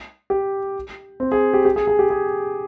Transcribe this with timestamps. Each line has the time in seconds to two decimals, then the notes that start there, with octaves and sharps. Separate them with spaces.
0.30 G4
1.20 C4
1.32 G#4
1.54 G4
1.65 G4
1.76 G#4
1.87 G#4
1.99 G4
2.10 G#4